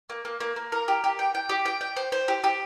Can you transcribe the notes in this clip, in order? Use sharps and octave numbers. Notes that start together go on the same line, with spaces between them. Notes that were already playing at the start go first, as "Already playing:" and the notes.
A#3
A#3
A#3
A#3
A#4
G4
G4
G5
G5
G4
G5
G5
C5
C5
G4
G4